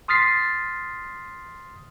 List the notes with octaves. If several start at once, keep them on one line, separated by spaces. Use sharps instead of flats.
C6 D#6 F6 A6 B6 C7